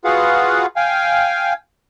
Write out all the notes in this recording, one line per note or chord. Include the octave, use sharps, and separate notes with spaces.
F4 F#4 G#4 B4 F5 F#5
F5 G5 G#5